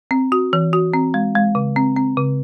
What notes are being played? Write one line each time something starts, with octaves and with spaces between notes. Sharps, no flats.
C4
F#4
E3
F#4
C4
G#3
G#3
C#3
C4
C4
C#3